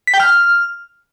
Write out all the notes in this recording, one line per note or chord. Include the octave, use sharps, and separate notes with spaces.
B6
G5
F6